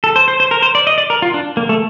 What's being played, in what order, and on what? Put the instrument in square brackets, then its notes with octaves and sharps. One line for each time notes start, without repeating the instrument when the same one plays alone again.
[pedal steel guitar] A4
C5
C5
C5
A#4
C5
D5
D#5
D5
A#4
F4
D4
A#3
A3